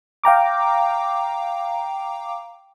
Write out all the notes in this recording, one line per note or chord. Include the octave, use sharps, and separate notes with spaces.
F5 G5 A#5 D6